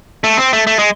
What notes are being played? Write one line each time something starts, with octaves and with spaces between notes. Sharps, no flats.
A3
C4
A3
A3
G#3